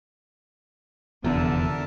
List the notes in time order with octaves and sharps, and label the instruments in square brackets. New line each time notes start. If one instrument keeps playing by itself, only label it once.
[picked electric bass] F1 E2 [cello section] D3 [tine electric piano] B3 [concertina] A#4 E5 A5